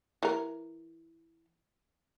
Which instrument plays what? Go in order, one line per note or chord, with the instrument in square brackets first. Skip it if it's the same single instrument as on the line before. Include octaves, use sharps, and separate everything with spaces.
[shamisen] E3 A#4